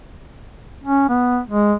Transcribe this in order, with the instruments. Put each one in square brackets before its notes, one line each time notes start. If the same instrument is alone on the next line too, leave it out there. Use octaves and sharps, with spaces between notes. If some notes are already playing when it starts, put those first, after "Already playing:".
[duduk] C#4
B3
G#3